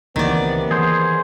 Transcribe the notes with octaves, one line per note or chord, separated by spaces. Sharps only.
C#2 C3 D#3 E3 A#3 B3 D5
E3 G#4 C5